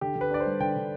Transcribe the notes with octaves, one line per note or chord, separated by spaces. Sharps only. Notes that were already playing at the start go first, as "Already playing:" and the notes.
D3 G4
D3
B4
D4 D5
C5
G3
D3 G5
D3